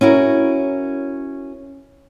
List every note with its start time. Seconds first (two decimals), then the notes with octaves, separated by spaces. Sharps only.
0.01 C#4 E4 F#4 A#4